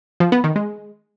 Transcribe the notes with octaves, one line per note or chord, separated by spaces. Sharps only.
F3
B3
D#3
G#3